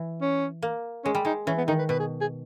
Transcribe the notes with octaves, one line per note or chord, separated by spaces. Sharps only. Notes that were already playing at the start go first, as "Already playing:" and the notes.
Already playing: E3
C#4
A#3
G#3 C#4
G3
G#3 D#4
E3 C#4
B3
D#3 D#4
B4
B2 B4
G#4
G#4